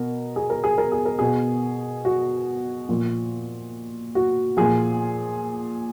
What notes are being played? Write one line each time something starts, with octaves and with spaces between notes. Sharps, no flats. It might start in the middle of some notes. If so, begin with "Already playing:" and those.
Already playing: B2 A#4
G#4
A#4
G#4
A#4
G#4
A#4
B2 G#4
F#4
A#2 F3
F#4
A#2 F3 G#4